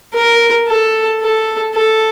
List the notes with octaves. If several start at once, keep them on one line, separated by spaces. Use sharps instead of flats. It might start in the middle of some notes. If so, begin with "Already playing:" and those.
A#4
A4
A4
A4